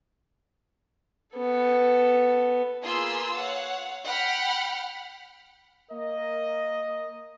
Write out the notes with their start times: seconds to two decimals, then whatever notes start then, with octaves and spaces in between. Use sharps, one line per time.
1.36 B3 A4
2.83 A#3 F4 G#4 B4 C6 E6
3.36 C#5 F5 F#5
4.06 F#5 G5 B5 F6
5.91 A#3 A#4 D#5